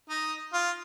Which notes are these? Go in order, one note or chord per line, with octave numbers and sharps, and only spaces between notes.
D#4
F4